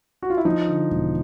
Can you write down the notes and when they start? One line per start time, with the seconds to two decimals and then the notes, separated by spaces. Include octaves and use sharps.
0.23 F#4
0.30 F4
0.37 E4
0.45 F3 D#4
0.67 D3
0.90 E1